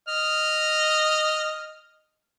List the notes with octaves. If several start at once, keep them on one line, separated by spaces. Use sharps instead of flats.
D#5 F6